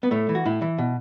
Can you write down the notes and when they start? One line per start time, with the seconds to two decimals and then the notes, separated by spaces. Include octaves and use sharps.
0.03 B3
0.11 A2 A3
0.29 E3
0.35 F#4
0.45 A2 E4
0.62 E3
0.78 B2